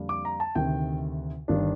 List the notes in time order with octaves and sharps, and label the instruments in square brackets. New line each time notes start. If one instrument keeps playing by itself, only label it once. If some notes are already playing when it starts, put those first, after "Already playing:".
Already playing: [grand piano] F2 D3 G3 A#3 D4
D6
A#5
A5
D2 C3 D#3 G5
G1 G2 D#3 G3 D4